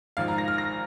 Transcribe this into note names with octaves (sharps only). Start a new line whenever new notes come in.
G#1 G#2 F3 F5
A#5
A#6
F6
A#6